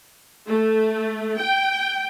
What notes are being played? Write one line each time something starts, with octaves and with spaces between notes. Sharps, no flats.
A3
G5